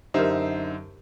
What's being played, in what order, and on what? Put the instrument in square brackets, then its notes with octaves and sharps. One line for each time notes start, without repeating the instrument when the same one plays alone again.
[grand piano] F#2 D3 [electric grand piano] D#4 C5 E5 [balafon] G4 A#4